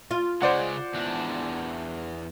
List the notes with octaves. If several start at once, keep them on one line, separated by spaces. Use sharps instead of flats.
F4
C#3 G#3 C5 D5 F#5
E2 D4